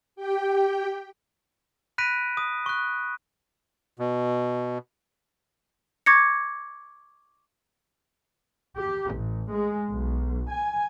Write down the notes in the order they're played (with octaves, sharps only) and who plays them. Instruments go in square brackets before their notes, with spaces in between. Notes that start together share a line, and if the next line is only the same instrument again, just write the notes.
[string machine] G4 G5
[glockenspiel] B5 F#6 A#6 B6 D7 D#7
D#6
C#6 F#6
[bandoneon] B2
[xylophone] C#6 D6 G#6 A#6 C#7
[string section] G4
A1
G#3
B1
G#5